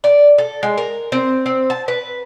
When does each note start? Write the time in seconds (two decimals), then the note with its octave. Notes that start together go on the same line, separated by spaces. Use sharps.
0.04 D5
0.38 A4
0.63 G#3
0.78 A#4
1.12 C4
1.46 C4
1.70 A5
1.88 B4